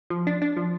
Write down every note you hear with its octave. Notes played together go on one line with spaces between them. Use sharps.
F3
D4
D4
F3